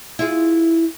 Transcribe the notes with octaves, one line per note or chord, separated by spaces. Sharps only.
E4 F4 G#4